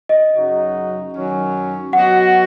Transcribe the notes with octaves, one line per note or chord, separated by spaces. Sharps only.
D#5
F#2 C#3 F#3 D#4 F#4
F#2 D#3 F#3 C#4
F#3 B3 F#4 D#5 F#5